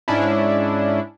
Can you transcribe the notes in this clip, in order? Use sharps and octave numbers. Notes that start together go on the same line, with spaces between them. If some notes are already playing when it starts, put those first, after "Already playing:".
G#2 C#4 D4 E4